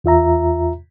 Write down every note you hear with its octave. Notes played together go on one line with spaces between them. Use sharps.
E2 F4 E5 A#5